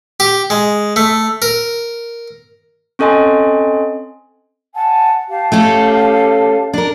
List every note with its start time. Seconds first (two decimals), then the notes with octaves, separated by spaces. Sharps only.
0.20 G4
0.50 G#3
0.96 A3
1.42 A#4
2.99 C4 C#4 A4 D#5 G#5 C6
4.75 F#5 G#5 A5
5.29 G4 F5 A5
5.52 A3 C#4 A4
6.73 D4 A#4